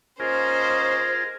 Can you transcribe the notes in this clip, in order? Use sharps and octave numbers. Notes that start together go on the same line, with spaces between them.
A#3 C#4 F4 G#4 A#4 C5 D#5